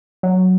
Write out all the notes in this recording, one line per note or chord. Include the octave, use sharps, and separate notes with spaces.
F#3